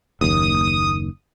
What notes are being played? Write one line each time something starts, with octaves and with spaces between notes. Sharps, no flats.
F#1 D#2 D#6